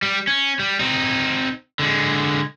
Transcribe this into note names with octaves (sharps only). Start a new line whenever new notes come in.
G3
C#4
G3
C4 D#4
D3 G#3